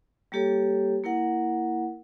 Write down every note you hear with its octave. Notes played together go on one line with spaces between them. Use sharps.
G3 A#3 G4 A4 C#5
A#3 E4 A#4 F#5